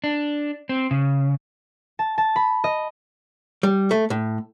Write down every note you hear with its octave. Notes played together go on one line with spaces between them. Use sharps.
D4
C4
C#3
A5
A5
B5
D#5
G3
A3
A2